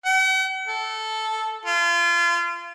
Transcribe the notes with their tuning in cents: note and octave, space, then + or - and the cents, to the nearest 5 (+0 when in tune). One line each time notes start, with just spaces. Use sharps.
F#5 +45
A4 -5
F4 -30